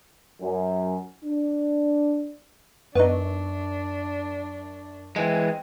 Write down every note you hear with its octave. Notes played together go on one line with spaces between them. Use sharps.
F#2
D4
F#2 B3 D4 D#4 C#6
E3 G#3 C4